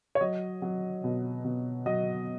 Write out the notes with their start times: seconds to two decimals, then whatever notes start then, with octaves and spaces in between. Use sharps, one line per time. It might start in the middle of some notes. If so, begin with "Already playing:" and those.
0.15 C#5
0.21 F#3 D#5
0.62 F#3
1.04 B2
1.45 B2
1.86 F#3 D#5